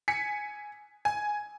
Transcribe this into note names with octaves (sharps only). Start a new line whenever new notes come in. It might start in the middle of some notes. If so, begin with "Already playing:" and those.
G#5 B6 C#7
G#5